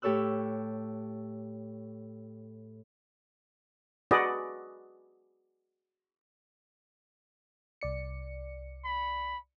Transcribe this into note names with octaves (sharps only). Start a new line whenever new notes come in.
A2 G4 A4 C#5 E6 F#6
F#4 G#4 B4 D5 D#5
C2 D5 C#7
B5